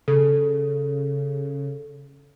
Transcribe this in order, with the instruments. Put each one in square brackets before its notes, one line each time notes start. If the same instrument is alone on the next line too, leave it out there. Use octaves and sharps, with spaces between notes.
[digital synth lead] C#3 [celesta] A4